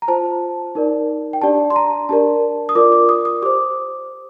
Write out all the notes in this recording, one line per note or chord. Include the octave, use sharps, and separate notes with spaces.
A#5
F4 C5 A5
D#4 A#4 D5
G5
D4 G4 D5 A5
C6
A#5
D4 G4 A#4 D5 A5
D#6
F4 A#4 D5 D6
D6
D#6
D#6
G4 C5 D6